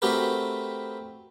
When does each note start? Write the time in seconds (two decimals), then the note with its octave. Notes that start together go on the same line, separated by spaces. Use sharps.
0.02 A3 C4 F#4 G4 A#4 B4